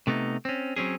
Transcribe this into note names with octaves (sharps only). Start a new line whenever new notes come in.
C3 A3 B3 D#4
C4 C#4
F#3 C4 C#4 G#4